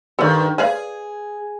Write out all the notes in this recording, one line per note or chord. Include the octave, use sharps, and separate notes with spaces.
G2 D#3 A4 D5
G#4 B4 D5 F5